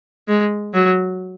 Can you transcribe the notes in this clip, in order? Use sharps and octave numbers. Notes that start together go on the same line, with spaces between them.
G#3
F#3